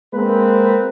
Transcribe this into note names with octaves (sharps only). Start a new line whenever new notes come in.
G#3 A#3 C4 B4